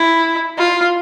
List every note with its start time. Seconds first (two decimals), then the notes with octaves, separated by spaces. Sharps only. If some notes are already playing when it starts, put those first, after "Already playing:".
Already playing: E4
0.58 F4